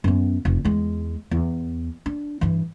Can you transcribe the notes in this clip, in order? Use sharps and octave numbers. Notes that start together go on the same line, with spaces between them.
F#2 B3
F1
E2 G#3
E2
D4
G2 E3